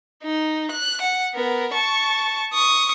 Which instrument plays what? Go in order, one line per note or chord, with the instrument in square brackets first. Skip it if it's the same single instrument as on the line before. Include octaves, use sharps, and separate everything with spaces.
[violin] D#4
F#6
F#5
B3 A#4
A5 C#6
C#6 D#6